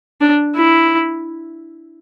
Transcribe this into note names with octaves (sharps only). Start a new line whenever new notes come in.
D4
E4